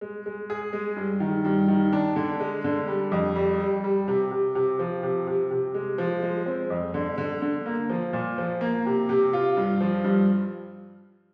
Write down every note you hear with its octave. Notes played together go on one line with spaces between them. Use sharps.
G#3
G#3
G#4
G#3
G2
D#3
G2
D#3
D4
D3
G#3
D3
G3
F2
G3
G3
G3
C3
C3
C3
F3
C3
C3
C3
G#3
F3
G#3
C4
F2
D3
D3
D3
A#3
F3
A#2
F3
A#3
C3
C3
F4
G2
F3
G2